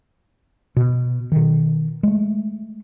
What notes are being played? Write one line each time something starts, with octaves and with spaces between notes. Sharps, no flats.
B2
B2 D#3
G#3 A3